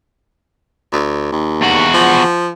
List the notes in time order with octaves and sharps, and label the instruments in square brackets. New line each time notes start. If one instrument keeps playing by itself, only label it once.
[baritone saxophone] D2
D#2
[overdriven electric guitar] E2 F#4
[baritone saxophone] F3